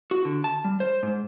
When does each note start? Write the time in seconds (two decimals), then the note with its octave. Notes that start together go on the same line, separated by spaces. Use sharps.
0.11 F#4
0.25 D3
0.44 A5
0.64 G3
0.80 C5
1.03 G#2